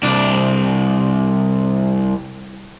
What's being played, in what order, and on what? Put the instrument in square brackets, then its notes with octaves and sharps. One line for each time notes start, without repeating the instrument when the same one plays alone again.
[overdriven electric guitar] C2 D4